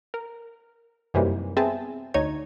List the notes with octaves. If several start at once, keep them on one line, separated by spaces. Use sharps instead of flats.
A#4
F#2 C3 E3 G3 A#3 D#4
B3 C4 G#4 E5 G#5 A5
D2 D#4 C#5 G#6